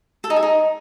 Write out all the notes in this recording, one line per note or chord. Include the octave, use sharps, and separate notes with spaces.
A4
D#4
G#4
D#4